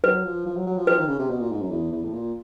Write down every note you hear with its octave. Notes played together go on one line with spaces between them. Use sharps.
F#3 B4
F3
F3
F#3
F#3
F3
F3 B4
D#3
C#3
C3
B2
A#2
G#2
F#2
E2
E2
A2
A#2